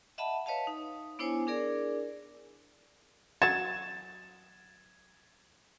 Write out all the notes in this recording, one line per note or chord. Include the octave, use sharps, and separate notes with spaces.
D#5 E5 F#5 A5 B5
B4 C#5 D#5 F5 A5
D#4
B3 D4 E4 C5 C#5 G#5
D4 G#4 A#4 D5
F#3 F#4 G#6 A6 E7